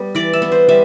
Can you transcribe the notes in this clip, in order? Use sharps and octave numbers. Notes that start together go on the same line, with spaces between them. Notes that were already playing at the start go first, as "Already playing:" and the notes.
Already playing: G3 B3
E3 D5
E5
B3
C5
G3 E5